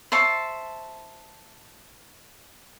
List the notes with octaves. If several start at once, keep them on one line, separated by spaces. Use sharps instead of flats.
C5 E5 A5 C#6